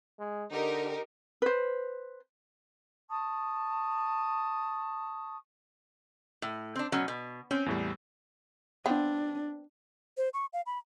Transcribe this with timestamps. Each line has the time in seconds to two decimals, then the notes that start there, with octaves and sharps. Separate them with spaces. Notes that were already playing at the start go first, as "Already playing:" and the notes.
0.19 G#3
0.51 D3 D#4 G4 A#4
1.42 B4 C5
3.09 A5 C#6 D#6
6.42 A2
6.75 C4 D4
6.92 B2 F#3 C#4
7.08 B2
7.51 C4 C#4
7.66 E2 A2 G3
8.86 B3 C4 D4 F5
10.17 C5
10.33 C#6
10.53 F5
10.66 B5